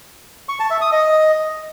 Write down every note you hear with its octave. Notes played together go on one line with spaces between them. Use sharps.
C#6
A5
E5
D#6
D#5